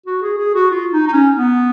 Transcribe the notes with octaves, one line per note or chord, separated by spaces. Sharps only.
F#4
G#4
G#4
F#4
F4
D#4
D#4
C#4
B3